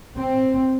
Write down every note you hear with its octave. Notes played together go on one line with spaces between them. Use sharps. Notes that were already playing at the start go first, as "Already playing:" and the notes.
C4